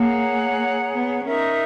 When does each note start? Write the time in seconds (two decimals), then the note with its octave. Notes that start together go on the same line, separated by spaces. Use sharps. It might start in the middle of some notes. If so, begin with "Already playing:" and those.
Already playing: A#3 G#4 C#5 F#5 A#5
0.91 B3
1.25 C#4 D#4 A#4 E5